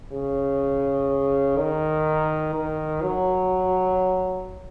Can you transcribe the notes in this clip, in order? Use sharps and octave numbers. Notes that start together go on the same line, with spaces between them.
C#3
D#3
D#3
F#3